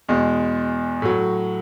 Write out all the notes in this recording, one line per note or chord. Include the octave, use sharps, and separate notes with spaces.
E2 B2 G#3
A2 F#3